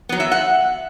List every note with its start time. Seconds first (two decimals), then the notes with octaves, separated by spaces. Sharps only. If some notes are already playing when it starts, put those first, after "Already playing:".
0.09 F#3 B3
0.20 E5
0.32 F#5